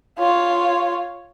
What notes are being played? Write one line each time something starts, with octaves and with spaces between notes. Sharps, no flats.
F4 C#5